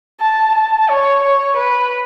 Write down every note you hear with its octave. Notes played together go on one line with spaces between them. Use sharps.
A5
A5
C#5
C#5
B4